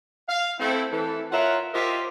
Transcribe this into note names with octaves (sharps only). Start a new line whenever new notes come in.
F5
A3 C4 E4
E3 A4
F4 A#4 C#5 E5 F#5
F4 G4 A#4 C5 D#5 E5